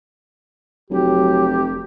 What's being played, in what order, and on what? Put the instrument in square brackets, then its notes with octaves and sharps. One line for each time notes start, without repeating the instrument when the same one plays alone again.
[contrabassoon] F1 [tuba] F#3 [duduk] G4